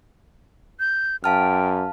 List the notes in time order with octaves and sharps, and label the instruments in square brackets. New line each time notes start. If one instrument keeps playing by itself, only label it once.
[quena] G6
[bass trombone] F#2 [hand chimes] F5 A5 F6 [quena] G5